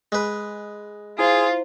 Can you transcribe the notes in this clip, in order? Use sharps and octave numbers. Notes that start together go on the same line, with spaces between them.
G#3 B4
E4 F4 G#4 C5